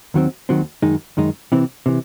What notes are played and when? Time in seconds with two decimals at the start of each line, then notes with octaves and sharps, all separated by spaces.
0.14 D#2 D#3 F#3 C4
0.49 D#2 D#3 F#3 C4
0.82 F#2 D#3 G#3 D#4
1.17 F#2 D#3 G#3 D#4
1.52 C3 E3 C4
1.86 C3 E3